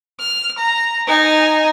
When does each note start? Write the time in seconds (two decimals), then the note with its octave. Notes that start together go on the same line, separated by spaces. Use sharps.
0.20 F6
0.58 A#5
1.07 D#4 G#5